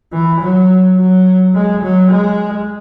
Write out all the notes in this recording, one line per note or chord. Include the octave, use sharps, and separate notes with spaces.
E3
F#3
F#3
G#3
F#3
G#3